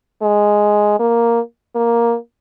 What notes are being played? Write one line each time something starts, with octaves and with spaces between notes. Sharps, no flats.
G#3
A#3
A#3